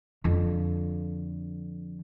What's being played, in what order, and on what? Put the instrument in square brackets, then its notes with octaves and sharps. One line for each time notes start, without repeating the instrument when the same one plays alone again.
[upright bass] F2 D3